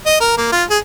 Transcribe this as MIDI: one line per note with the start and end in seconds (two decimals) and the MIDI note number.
0.06 0.19 75
0.20 0.36 70
0.37 0.50 58
0.52 0.63 65
0.70 0.78 68